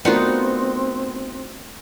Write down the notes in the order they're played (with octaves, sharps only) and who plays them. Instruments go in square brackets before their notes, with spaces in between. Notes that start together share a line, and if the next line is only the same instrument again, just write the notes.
[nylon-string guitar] A3 D4 A#4 [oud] B3 [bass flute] C4 [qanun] D#4 F4 F#4